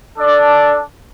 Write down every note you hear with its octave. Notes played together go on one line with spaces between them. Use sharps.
D4 A4 D5